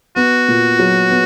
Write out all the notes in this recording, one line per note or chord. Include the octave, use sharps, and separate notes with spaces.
B3 F#4
A#2
F#3
B3